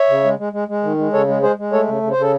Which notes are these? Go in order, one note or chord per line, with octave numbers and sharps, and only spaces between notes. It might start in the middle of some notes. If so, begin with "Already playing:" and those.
Already playing: C#5 E5
C#3
G#3
G#3
G#3
G#3
D#3
G#3
C#3 A4 C#5
G#3
G#3 G#4 C5
G#3
A3 A4 C#5
C#3
C#3
C5
C#3 A4